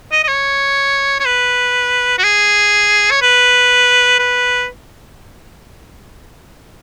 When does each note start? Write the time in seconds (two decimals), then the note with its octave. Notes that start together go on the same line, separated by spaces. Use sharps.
0.12 D#5
0.24 D#5
0.28 C#5
1.20 C#5
1.25 B4
2.18 F#4
2.23 G#4
3.11 C#5
3.22 B4
4.19 B4